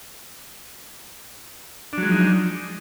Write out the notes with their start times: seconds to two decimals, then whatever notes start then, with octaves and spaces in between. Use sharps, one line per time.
1.93 D4
1.98 F#3
2.02 G#3
2.07 F3
2.12 D#4